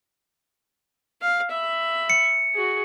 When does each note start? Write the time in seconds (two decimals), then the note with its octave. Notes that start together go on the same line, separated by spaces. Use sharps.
1.22 F5
1.51 E5 B5
2.10 C#7
2.54 F#4 G#4